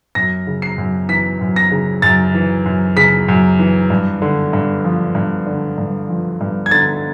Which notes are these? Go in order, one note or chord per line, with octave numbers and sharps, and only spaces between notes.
F#2 A#6
C#3
C7
F#2
E3 B6
F#2
A#6
C#3
F#2 A6
E3
F#2
C#3 B6
F#2
E3
G2
D3
G2
F3
G2
D3
G2
F3
G2
G#6
D3 A6